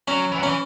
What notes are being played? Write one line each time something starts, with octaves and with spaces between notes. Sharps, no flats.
F#3 C#4
E3
F#3
E3 C#4